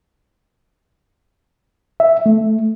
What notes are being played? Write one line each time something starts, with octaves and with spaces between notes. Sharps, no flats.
E5
A3